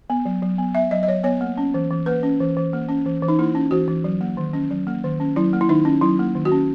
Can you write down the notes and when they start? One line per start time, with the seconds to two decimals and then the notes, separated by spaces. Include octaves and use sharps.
0.10 B3
0.25 F#3
0.42 F#3
0.58 B3
0.75 B3 E5
0.91 F#3 D#5
1.03 D#5
1.08 F#3 C#5
1.24 B3 C#5
1.41 A#3
1.58 C#4
1.74 E3
1.91 E3
2.06 A#3 B4
2.23 C#4
2.40 E3
2.57 E3
2.73 A#3
2.89 C#4
3.06 E3
3.22 E3
3.28 D#4
3.39 A#3 E4
3.55 C#4
3.71 E3 F#4
3.88 E3
4.04 F#3
4.21 A#3
4.37 D#3
4.53 C#4
4.71 F#3
4.87 A#3
5.04 D#3
5.20 C#4
5.36 F#3 E4
5.53 A#3
5.61 E4
5.69 D#3 D#4
5.85 C#4
6.01 F#3 E4
6.19 A#3
6.35 D#3
6.45 F#4
6.52 C#4